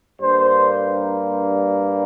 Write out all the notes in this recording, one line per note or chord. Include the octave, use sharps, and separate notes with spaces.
G2 G3 A#3 C5